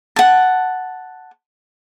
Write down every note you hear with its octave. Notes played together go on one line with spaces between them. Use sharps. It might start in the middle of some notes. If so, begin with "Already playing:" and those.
F#5 A5